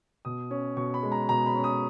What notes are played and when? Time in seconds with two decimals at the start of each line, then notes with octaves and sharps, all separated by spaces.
0.25 B2 D#6
0.51 C#4
0.76 B2 C#6
0.94 B5
1.03 G#3
1.12 A#5
1.29 B2 A#5
1.46 B5
1.55 C#4
1.64 D#6